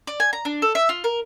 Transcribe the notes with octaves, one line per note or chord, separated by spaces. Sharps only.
D5
G#5
A#5
D4
A4
E5
F4
A#4